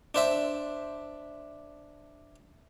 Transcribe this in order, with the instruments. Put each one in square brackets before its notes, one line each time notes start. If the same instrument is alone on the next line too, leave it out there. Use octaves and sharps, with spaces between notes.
[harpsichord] D4 C5 E5